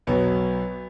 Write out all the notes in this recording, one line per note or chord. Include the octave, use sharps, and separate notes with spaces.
B1 B2 F#3 B3